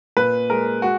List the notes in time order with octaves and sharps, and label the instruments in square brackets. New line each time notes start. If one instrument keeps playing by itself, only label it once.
[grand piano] A#2 B4
G#3 A#4
G#3 F#4